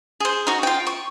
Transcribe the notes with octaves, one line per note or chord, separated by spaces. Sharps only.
G#4 C5
D#4 F#4
F4 G5
C#6